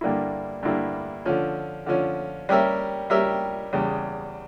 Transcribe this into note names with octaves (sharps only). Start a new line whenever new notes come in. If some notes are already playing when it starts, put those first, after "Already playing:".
G2 D3 G3 A#3 E4
G2 D3 G3 A#3 E4
D3 F3 C#4
D3 F3 C#4
G3 C#4 G4 A#4 E5
G3 C#4 G4 A#4 E5
E2 C#3 G3